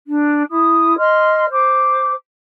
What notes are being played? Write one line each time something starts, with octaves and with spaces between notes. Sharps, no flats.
D4
E4 D#6
D#5 C6 F6
C5 D6